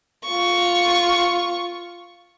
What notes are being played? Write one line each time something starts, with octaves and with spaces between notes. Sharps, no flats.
F4 C#6